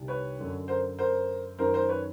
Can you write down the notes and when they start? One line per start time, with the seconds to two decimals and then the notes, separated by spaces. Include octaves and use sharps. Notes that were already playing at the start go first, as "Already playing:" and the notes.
Already playing: C2 C3 D#3
0.08 B4 C#5
0.39 F#2 D3
0.68 A#4 C5
0.99 A#4 C5
1.58 F#2 D#3 A#4 C5
1.74 A#4 C5
1.89 B4 C#5